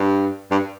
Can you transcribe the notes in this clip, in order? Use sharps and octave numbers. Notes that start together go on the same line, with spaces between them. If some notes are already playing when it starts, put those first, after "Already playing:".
Already playing: G2
G2